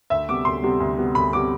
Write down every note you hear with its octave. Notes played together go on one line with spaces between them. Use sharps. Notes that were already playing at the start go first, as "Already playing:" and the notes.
D2 E5
C3 G3 B3 D6
D2 C6
C3 G3 B3
D2
C3 G3 B3
D2 B5
C3 G3 B3 D6